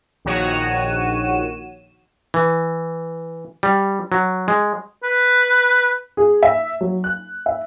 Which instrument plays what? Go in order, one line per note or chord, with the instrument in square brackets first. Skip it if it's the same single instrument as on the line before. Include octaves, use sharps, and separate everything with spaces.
[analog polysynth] A#1 D#3 F#4 C#5 D#7 E7
[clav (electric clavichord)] E3
G3
F#3
G#3
[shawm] B4
[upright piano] G#4
E5
F#3
F#6
E5